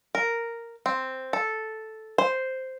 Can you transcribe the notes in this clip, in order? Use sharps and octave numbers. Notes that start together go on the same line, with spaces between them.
A#4
C4
A4
C5